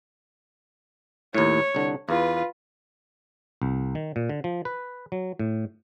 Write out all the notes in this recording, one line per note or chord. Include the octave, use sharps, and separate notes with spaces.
D#2 A2 C#5
C2 D3
E2 F4 B4
C2
D#3
A#2
D3
F3
B4
F#3
A2